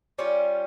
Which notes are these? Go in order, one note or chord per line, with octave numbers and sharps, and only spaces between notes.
G3 C#4 F4